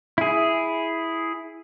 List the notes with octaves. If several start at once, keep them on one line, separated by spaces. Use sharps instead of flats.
E4 G#4